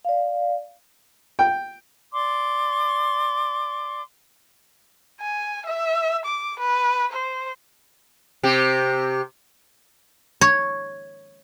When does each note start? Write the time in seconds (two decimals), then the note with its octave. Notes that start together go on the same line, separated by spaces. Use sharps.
0.05 D5 F5
1.39 G5
2.12 D5 C6 D6
5.20 G#5
5.66 E5
6.25 D6
6.60 B4
7.12 C5
8.43 C3 G4
10.41 C#5